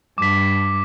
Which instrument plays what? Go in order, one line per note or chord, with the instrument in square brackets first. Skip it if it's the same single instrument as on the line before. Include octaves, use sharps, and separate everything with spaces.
[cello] G2 [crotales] D6 B6